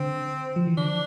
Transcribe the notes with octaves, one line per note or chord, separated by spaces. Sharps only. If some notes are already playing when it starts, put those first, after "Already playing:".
Already playing: D3 C4
F3
E3
D3 D4